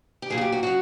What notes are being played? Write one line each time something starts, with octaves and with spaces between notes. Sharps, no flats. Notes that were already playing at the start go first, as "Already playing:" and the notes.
G4
A#2 F#3 G#4
F#4
G4
F#4
C#3 F#3 F#4